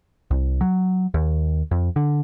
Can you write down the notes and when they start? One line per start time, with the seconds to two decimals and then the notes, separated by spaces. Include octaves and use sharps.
0.31 C2
0.61 F#3
1.14 D#2
1.71 F2
1.96 D3